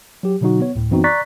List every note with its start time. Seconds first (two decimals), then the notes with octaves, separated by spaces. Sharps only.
0.23 F#3 G4
0.41 B2 D3 F#3 D#4 F#4
0.60 B3 C#5
0.75 D2 A2
0.91 F#2 E3 B3 C4 D#4 F#4
1.04 D5 A#5 C#6 F#6 A6 B6